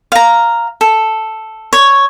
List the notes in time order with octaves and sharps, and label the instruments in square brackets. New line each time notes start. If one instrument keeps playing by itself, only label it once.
[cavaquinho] F5 A#5
A4
C#5